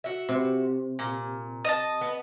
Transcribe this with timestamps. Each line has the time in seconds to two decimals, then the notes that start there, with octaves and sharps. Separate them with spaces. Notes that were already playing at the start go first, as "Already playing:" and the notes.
0.04 F#4 E5
0.29 C3
0.99 A#2
1.65 D#5 A5
2.01 B3